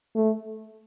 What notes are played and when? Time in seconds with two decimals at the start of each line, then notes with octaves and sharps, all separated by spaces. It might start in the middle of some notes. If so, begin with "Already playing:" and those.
0.15 A3